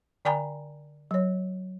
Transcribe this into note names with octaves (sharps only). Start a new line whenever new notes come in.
D3 D5 G5 G#5 A#5 B5
F#3 C#5